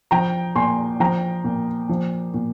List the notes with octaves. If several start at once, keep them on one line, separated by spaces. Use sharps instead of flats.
F3 G5 A#5
A#2 G#5 C6
F3 G5 A#5
A#2
F3
A#2